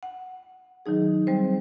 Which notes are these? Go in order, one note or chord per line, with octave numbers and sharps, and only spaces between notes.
F#5
D#3 F#3 D#4 G#4
G3 C4 C5